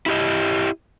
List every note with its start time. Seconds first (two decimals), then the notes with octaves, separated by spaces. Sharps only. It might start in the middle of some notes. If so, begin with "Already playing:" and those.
0.06 E4 G4 D#5